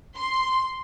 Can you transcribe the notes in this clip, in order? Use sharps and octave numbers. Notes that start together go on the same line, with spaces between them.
C6